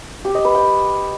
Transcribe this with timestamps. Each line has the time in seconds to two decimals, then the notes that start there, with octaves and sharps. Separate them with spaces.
0.25 G4
0.35 D#5
0.45 B4
0.55 G5